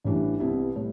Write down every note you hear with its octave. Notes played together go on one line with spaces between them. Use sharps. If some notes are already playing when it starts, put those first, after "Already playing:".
A1 A2 E3 G3 D4
C2 C3 G3 B3 E4
A2 G3